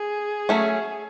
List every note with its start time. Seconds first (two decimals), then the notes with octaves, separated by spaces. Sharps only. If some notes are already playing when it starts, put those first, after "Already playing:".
Already playing: G#4
0.49 F#3 A3 C#4